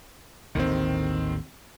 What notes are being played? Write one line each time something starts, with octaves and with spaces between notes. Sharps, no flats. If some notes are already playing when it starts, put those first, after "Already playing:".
A1 D#2 D3 D#3 C4